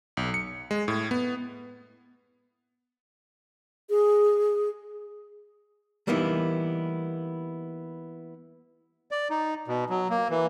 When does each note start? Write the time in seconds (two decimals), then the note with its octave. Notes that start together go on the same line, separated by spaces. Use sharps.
0.17 B1
0.34 C#7
0.71 G#3
0.88 A2
1.11 B3
3.90 G#4
6.07 E3 G3 A#3 B3 D#4 E4
9.11 D5
9.30 D#4
9.68 B2
9.90 F#3
10.10 A#3
10.30 E3